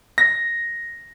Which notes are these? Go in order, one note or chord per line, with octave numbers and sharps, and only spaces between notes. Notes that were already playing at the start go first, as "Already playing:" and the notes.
A#6